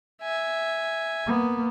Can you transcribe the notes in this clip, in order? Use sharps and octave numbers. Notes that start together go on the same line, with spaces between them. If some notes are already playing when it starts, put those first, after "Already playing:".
E5 G#5
A#3 B3